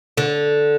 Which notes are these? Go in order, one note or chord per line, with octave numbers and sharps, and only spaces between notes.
D3